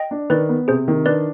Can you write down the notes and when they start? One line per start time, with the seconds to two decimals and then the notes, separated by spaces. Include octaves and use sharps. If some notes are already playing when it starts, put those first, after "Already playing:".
Already playing: D#5 G5
0.11 D4
0.30 D#3 B4 D5
0.49 B3
0.68 C3 G#4 C5
0.88 D#3
1.06 D4 B4 D5